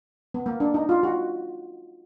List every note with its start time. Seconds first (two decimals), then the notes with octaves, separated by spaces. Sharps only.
0.34 B3
0.46 A#3
0.60 D4
0.74 D#4
0.89 F4
1.03 F#4